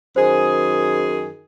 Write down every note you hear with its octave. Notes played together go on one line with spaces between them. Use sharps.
F#2 D#3 G#4 C5